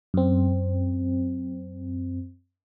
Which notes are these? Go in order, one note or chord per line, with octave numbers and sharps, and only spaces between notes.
F#2 C4